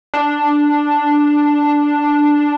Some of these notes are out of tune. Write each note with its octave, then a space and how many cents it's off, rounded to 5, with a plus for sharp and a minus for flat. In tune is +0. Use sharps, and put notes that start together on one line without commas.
D4 +0